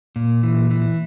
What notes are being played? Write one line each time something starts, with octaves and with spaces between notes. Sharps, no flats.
A#2
E3
E3